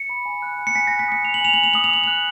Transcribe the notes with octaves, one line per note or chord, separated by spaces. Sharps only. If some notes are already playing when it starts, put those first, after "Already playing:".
Already playing: C#7
B5
G#5
F#6
G#5
C#7
G#5 B6
F#6 A#6
B6
D#6 C#7
D#6 F7
F#7
G#5 F7
G#5 F#7
F7
D#6 F#7
F7
D#6 F#7
F#6 F7